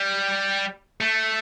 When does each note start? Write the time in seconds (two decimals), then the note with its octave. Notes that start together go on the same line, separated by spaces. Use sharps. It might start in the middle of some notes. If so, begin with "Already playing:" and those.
Already playing: G3
1.01 A3